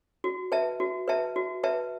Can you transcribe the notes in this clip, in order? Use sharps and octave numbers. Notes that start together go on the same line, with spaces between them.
F#4
B4 E5 A5
F#4
B4 E5 A5
F#4
B4 E5 A5